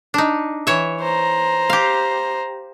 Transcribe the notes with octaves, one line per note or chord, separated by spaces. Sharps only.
D4 D#4
E3 C#5 E5
C5 A#5
G4 F5